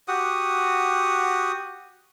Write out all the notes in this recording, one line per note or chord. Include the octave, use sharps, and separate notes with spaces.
F#4 G4 F#5 D#6